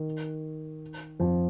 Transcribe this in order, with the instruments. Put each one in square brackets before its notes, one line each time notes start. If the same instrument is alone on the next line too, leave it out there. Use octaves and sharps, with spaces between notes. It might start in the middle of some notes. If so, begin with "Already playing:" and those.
Already playing: [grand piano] D#3
F2 F3